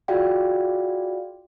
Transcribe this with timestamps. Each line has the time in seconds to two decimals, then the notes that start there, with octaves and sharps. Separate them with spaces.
0.08 F4 F#4 G#4 D5 F5 G5